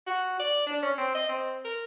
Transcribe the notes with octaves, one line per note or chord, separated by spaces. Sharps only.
F#4
D5
D4
C#4
C4
D#5
C4
A#4